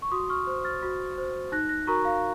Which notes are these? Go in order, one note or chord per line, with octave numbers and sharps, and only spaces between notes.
C#6
F#4 C6 D#6
C#6 F6
C5
F6 A6
F#4
C5
D#4 F#6 A#6
F#6 A#6
F#4 A#4 A#5 C#6
F5